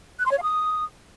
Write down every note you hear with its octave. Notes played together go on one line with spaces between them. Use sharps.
F#6
C6
C#5
F5
D#6